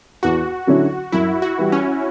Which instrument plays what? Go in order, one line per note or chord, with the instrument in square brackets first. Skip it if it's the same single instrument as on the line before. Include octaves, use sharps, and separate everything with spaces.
[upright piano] E2 [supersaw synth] F#4
[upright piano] D3 F#3 C#4 E4
[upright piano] F#2 [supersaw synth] E4
[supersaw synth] F#4
[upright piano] E3 G3
[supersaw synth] C#4